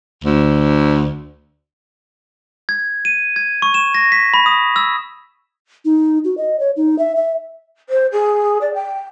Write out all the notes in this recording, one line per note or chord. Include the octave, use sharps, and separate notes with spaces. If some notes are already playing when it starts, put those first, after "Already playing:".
D2
G#6
D#7
G#6
C#6
E7
A#6
B6
B5
D#6
E6
D#4
F#4
D#5
C#5
D#4
E5
E5
C5
G#4
D5
G5